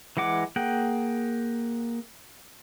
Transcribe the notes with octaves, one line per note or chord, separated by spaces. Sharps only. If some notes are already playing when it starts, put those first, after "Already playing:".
E3 G#3 F#5 D6
A#3 G#4 F#5 G5